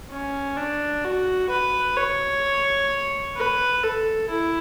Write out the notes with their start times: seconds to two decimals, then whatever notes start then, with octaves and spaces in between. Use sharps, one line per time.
0.11 C#4
0.57 D4
1.04 F#4
1.50 B4
1.97 C#5
3.37 B4
3.84 A4
4.29 E4